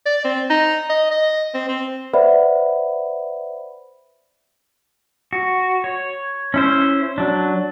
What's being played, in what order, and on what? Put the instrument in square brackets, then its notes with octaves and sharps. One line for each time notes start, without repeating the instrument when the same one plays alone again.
[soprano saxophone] D5
C4
D#4
D#5
D#5
C4
C4
[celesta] B4 C5 D5 E5 F#5 B5
[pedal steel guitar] F#4
C#5
C#4 E4 C5
F#3 D4